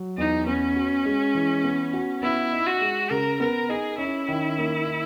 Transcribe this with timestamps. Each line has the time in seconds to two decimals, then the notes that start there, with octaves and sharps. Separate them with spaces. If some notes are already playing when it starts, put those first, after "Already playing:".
Already playing: F#3
0.17 E2 D#4
0.47 B3 C#4
0.76 F#4
1.05 G#3
1.35 E3
1.64 B3
1.93 F#4
2.23 B3 E4
2.52 D#4
2.67 F#4
2.81 G#3
3.11 C#3 A#4
3.40 B3 A#4
3.69 D#4 G#4
3.98 C#4 E4
4.28 D#3
4.58 A#3
4.87 D#3